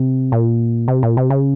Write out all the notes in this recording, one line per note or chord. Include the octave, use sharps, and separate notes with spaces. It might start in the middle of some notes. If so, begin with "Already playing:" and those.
Already playing: C3
A#2
C3
A#2
C3
C#3